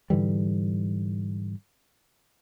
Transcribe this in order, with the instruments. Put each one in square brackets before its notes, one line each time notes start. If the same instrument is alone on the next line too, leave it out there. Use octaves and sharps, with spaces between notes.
[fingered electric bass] G#2 D3 E3 G3